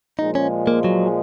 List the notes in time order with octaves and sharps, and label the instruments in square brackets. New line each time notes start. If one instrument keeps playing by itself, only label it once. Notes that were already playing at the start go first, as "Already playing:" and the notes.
[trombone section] A#2 F3 G#3 [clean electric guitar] D#4
[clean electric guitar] C#4
A#3
F#3